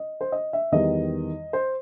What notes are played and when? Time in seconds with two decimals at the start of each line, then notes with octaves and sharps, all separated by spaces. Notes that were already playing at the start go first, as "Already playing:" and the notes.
Already playing: D#5
0.21 C5
0.32 D#5
0.53 E5
0.72 E2 D#3 G3 D#5
1.53 C5